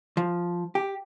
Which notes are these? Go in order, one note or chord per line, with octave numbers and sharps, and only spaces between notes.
F3
G4